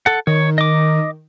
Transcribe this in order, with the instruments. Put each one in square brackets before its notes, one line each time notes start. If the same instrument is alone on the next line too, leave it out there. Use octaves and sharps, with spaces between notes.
[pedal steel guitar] A4 F#5
[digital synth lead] D#3 [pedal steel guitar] C#5
[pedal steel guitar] D#5 D6